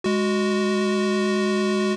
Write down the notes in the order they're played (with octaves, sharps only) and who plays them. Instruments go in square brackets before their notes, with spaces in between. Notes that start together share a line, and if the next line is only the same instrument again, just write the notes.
[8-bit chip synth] G#3 F#4